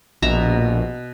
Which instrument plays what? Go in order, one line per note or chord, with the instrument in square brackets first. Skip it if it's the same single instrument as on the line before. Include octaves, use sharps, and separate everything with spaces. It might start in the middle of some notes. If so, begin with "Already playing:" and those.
[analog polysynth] A#1 [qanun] B2 E5 A#5